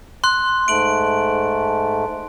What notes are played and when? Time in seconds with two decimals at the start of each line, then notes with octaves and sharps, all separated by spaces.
0.24 C6 F#6
0.68 G#2 A3 D7 F#7